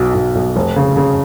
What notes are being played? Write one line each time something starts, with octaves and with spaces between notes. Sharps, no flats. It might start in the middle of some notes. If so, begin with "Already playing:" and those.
Already playing: B1 B2
B1
B1
F1
C#3
C#3